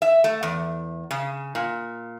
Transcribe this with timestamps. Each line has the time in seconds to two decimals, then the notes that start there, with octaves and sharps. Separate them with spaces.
0.02 E5
0.24 A3
0.43 E2
1.11 C#3
1.55 A#2